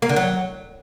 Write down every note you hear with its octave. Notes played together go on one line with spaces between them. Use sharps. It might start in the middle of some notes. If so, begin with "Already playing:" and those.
A#3
D3
F#3